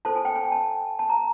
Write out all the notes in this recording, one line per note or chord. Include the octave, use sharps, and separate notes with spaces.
F4 A4 C5 A5
G#5
G5
G#5
A5
A5
A#5